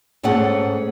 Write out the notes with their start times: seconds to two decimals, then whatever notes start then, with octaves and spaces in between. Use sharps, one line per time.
0.23 G#2 A3 C#4 G#4 F#5